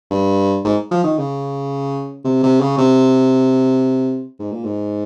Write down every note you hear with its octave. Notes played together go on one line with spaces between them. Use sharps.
G2
G#2
F3
D#3
C#3
C3
C3
C#3
C3
G#2
A#2
G#2